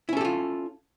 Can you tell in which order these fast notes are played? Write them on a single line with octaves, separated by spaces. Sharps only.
E4 C#4 A4 G4 F4